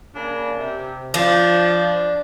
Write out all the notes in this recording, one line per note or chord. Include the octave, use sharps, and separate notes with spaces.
C#3 A#3 D4
C3
F3 D4